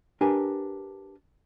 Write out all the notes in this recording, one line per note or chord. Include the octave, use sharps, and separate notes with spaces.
D4 G4 A#4 B4 G#5